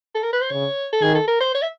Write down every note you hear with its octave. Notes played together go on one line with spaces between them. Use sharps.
A4
A#4
B4
C5
C#3 C#5
A4
D#3 G#4
A4
A#4
C5
C#5
E5